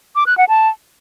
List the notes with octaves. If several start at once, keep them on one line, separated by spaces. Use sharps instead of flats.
D6
F#6
F#5
A5